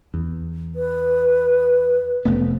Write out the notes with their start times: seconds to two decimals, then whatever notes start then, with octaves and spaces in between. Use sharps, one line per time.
0.14 E2
0.75 B4
2.25 F1 A3 B3